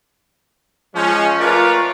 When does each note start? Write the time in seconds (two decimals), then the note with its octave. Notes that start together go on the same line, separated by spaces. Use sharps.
0.95 F3 G#3 C#4
1.40 A3 F4 A#4 B4 C#5 D5